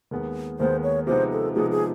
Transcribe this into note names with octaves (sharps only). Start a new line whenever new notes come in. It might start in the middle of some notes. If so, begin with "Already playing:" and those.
D#2 D#3 G#3 B3
D#2 D#3 G#3 B3 C5
C#5
C3 F3 G#3 B3 D#4 C5
A4
C3 F3 G#3 B3 D#4 G#4
G#4